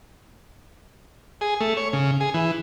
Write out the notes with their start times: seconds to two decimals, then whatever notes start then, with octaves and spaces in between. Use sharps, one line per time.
1.41 G#4
1.61 A3
1.77 C#5
1.93 C#3
2.20 G#4
2.34 E3